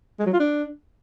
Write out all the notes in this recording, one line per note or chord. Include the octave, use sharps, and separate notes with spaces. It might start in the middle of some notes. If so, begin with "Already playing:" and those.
G#3
F#3
F4
D4